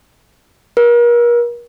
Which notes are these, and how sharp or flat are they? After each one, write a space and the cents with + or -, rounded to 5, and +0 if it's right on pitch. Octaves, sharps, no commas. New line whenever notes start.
A#4 +40